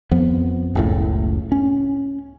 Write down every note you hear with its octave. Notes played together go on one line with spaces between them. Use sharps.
F2 F3 B3
F#1 C#2 A2
C#4